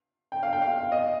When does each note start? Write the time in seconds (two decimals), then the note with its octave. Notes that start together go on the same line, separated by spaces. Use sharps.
0.32 G5
0.43 F5
0.53 G5
0.62 F5
0.92 D#5